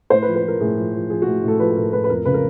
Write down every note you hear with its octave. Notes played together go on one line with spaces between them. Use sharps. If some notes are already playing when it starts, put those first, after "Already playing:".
A2 C5
B4
F3
B4
F3 A#4
A2 G#4
F3
F3
F3 G#4
A2 F#4
A2 A4
F3 B4
A4
A2 A#4
A2 B4
B4
F2 A#4
C#3 B4
A#4